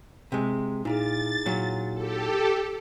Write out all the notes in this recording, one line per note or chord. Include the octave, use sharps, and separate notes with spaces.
C3 G#3
A#2 D#4 E4 G#4 A6
A#2 F#3
G4 A4